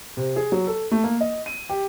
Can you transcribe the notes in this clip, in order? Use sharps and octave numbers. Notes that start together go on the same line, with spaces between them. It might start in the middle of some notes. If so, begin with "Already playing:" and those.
C3
G#4
F#3
A4
A3
A#3
D#5
D#7
G4